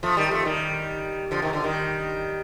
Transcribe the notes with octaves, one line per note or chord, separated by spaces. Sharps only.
F3 A3
D#3 G3
F3 A3
D#3 G3
D3 F3
C3 D#3
D3 F3
D#3 G3